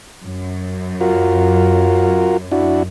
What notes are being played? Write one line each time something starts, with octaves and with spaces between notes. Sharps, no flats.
F#2
F4 F#4 A#4
D4 E4 F#4